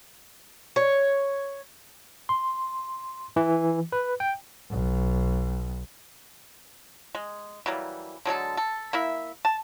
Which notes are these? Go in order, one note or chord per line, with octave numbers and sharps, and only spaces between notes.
C#5
C6
E3
B4
G5
B1
G#3
E3 F#3 G3 A#3
D3 F#3 G#3 A4
A4
A#3 E4 E5
A5